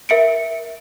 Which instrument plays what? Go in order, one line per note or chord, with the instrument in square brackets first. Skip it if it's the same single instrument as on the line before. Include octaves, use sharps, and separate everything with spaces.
[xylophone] A#4 E5 C#7 D7